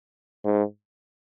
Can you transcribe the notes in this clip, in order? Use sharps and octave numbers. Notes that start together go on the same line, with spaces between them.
G#2